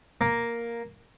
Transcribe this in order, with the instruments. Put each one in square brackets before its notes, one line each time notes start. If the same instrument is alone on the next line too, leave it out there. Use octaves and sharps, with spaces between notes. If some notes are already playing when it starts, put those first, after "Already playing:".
[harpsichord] A#3